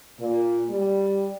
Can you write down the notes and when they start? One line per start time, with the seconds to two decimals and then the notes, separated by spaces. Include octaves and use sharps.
0.19 A#2
0.69 G3